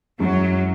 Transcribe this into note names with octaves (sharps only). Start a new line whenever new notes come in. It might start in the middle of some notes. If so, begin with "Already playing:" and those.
F#2 E3 F#3 G#3